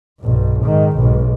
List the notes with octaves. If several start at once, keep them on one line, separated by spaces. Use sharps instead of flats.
B1 G2
G#2 D#3
B1 G#2